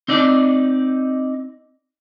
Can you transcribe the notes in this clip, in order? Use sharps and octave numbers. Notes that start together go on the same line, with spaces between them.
C4 D#4 D5